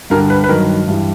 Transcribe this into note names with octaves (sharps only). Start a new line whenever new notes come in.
G2 D3 G3 A#4
B4
B4
G2 D#3 F#3 A#4
G2 E3 G3